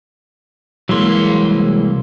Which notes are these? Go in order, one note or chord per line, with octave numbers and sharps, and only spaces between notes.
C2 E3 F#3 G#3 A#3 C6